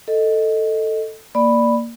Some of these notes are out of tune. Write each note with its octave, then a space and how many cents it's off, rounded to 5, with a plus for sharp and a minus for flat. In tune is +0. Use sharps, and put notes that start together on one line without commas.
A4 +5 D#5 +0
A#3 +0 D5 +5 B5 +0